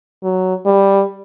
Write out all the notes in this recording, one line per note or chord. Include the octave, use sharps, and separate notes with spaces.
F#3
G3